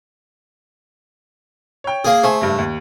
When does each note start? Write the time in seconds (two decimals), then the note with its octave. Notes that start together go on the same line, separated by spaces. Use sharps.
1.84 C#5 G5
2.05 A#3 G#4
2.24 A3 G#4 C5
2.41 F#1 G2
2.58 D#2